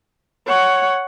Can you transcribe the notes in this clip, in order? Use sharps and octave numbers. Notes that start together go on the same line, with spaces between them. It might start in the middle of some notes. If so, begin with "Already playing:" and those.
C#5 F#5